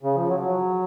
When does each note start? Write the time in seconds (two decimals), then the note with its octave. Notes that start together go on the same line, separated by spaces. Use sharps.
0.03 C#3
0.15 F3
0.28 F#3
0.40 F#3